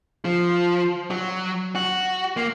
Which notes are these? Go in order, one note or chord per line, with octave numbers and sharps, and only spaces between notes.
F3
F#3
F#4
A#3